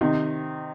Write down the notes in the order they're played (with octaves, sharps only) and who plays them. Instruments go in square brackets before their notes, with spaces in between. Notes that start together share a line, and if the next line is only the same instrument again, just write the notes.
[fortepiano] C3 D#3